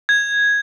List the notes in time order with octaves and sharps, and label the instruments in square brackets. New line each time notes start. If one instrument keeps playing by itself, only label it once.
[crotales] G#6